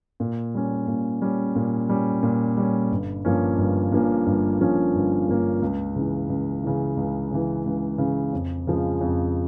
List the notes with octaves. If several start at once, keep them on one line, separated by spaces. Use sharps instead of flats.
A#2
G3 C#4
A#2
G3 C#4
A#2
G3 C#4
A#2
G3 C#4
G1
G2 F3 A#3 C#4
G1
G2 F3 A#3 C#4
G1
G2 F3 A#3 C#4
G1
G2 F3 A#3 C#4
C#2
C#3 E3
C#2
C#3 E3
C#2
C#3 E3
C#2
C#3 E3
F2
C#3 F3 G#3
F2